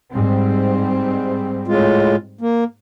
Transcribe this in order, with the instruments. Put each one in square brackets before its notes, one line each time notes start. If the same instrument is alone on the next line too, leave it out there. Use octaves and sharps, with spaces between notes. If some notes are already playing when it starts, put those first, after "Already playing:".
[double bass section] G#2 G3 C4
[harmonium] A2 G#3 F4
A#3